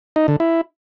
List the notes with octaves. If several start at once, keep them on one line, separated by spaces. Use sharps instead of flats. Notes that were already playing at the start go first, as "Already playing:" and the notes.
D#4
D3
E4